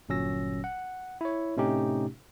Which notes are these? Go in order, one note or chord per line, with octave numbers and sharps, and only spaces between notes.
G1 A#2 F#3 C#4 E6 A#6
F#5
E4 C#5
A2 C3 A3 C#4 D#4 G4